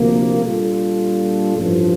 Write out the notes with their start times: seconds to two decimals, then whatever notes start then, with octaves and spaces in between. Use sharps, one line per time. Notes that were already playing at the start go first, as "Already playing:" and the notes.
Already playing: D2 C3 F3 A#3
0.41 A#2 G3 D4 F4 A4
1.55 A1 G2 F3